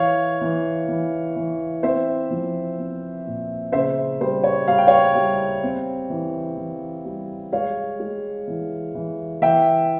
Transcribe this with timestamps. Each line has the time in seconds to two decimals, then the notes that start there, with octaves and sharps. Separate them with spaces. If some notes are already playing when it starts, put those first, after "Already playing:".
Already playing: E3 C#5 F5
0.41 E3
0.88 E3
1.36 E3
1.83 C4 C5 E5
2.31 F3
2.78 C4
3.26 A#2
3.72 C#3 C5 E5
4.21 G3 C5
4.44 C#5
4.68 G3 F5
4.78 G5
4.87 C#5 F5
5.15 G3
5.63 C4
6.10 E3
6.57 E3
7.05 G3
7.52 G#3 C#5 F5
7.99 G#3
8.48 E3
8.95 E3
9.42 E3 E5 G5